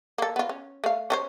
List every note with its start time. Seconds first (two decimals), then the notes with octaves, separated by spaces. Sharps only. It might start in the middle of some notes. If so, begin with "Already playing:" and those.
0.18 A#3 A4
0.36 B3 F4
0.49 C#4
0.84 A3 F5
1.10 C#4 A4 C5